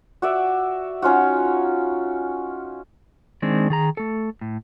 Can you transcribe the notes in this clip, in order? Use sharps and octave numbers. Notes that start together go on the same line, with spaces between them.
F#4 D5 E5
C#4 D#4 F4 F#4
D#3 G#3 C4 D4
D#3 G#4 A#5
A3 A4
A2